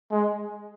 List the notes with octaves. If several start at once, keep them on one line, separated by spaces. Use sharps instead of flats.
G#3